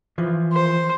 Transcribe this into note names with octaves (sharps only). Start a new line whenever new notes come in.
E3 F3
C5